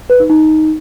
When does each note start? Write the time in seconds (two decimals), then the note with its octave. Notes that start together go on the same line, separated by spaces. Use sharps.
0.10 B4
0.20 D#4
0.30 D#4